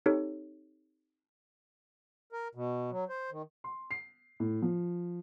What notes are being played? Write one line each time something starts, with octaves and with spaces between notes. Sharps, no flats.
C4 D#4 G4 A4 C#5
A#4
B2
F#3
C5
D#3
C6
C7
A2
F3